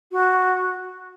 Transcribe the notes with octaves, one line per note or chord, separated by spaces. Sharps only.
F#4